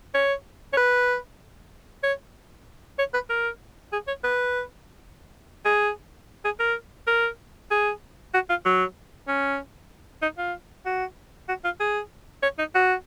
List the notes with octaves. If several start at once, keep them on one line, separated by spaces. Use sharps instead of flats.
C#5
C#5
B4
C#5
C#5
B4
A#4
G#4
C#5
B4
G#4
G#4
A#4
A#4
G#4
F#4
F4
F#3
C#4
D#4
F4
F#4
F#4
F4
G#4
C#5
D#4
F#4